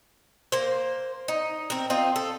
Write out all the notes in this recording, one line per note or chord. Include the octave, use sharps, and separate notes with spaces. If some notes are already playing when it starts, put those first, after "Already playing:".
A#3 C5
D#4
C4 A#4
C4 D#4 F4
A4